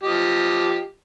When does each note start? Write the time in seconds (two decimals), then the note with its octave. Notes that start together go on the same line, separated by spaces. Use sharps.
0.03 F3 G4 D#5